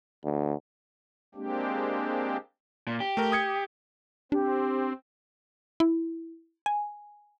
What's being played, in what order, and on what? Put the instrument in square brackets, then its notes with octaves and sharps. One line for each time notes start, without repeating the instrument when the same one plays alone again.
[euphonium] D2
[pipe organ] G#3 A#3 C4 D4 G4
[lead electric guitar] A#2
G4
[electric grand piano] A3 A#4
D#6 G#6 C#7
[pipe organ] C4 [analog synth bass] D4 [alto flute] G4
[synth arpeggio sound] E4
G#5